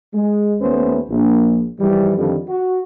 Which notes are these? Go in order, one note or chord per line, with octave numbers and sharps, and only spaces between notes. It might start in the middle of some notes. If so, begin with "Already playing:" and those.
G#3
D#2 A3 B3 C#4 B4 C5
A#1
G#2 E3 F3 G3
F2 D3 D#3 F3 G3
F#4